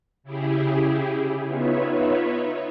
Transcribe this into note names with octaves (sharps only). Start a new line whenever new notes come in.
C#3 E4 G4 G#4
B3 D#4 F4 B4 C#5 E5